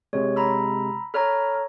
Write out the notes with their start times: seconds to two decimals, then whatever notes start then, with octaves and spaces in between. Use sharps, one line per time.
0.13 C3 G#3 C#5
0.36 A#5 B5 E6
1.14 A4 C#5 A#5 B5 F6